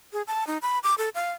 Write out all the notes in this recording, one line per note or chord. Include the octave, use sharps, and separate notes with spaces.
G#4
A5
D#4
B5
D6
A4
F5